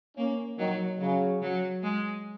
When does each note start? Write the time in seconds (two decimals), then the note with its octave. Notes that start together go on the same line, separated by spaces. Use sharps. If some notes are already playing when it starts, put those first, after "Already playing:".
0.17 A#3 C#4
0.59 D#3 F#3
1.00 C#3 F#3
1.42 F#3
1.83 G#3